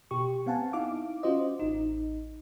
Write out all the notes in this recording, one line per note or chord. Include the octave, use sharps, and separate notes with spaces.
B2 G4 C#6
B3 C4 F5 F#5 G#5 A5
D#4 E4 F5 D6
C#4 F4 F#4 C5 D#5
A1 D#4